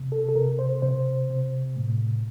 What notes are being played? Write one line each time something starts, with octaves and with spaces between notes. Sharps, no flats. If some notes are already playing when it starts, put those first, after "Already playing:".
Already playing: C3
A4
A4
C3 A#4
C5
C3 C5
C3
A2